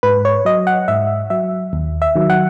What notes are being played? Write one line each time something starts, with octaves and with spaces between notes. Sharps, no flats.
G#2 B4
C#5
F#3 D#5
F#5
G#2 E5
F#3 E5
D#2
E5
D#3 F#3
F#5